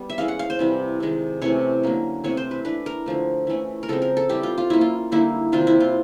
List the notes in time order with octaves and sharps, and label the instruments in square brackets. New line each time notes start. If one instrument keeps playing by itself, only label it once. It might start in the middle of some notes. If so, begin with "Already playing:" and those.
Already playing: [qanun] G3 B3
E5
E3 G#3 C#4 F5
F#5
F5
C5
C3 E3 G3
C3 D#3 G#3
C3 E3 A3 C#4 C#5
D3 F#3 A#3 C#4
C3 E3 A3 C4 C#5
C5
B4
E3 A3 D4 B4
A#4
D3 F3 A3
E3 A3 C#4 E4
A#4
C#3 F3 G#3 C4 A4
A#4
A4
E3 G3 C4 E4 G4
F4
F4
F#3 A#3 C#4 E4
F4
D3 G3 A#3 D#4 E4
C3 D#3 G3 C4 F4
E4
F4